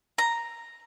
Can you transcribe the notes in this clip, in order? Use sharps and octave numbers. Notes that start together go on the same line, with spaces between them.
A#5